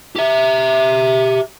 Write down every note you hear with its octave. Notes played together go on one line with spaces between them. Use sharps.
G4 E5